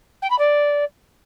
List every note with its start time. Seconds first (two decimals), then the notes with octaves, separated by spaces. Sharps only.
0.22 G5
0.30 B5
0.38 D5